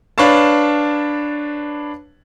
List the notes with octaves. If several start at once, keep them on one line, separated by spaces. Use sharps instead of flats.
D4 B4 C#5 F5 A5